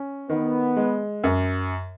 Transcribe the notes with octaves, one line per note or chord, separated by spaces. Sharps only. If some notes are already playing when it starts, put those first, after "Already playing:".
Already playing: C#4
D#3 B3
G#3
F#2